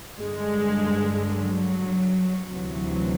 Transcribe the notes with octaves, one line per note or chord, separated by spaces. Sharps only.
G2 D3 G#3
F#3
D2 C3 E3 F#3